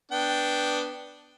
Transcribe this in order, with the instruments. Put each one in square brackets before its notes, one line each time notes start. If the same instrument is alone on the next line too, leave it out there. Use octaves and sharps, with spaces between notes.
[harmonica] B3 D4 G5